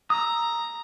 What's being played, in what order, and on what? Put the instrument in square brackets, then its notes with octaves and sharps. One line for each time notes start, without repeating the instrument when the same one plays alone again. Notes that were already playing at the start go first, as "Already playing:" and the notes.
[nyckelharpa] A#5 [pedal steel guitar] D#6 E6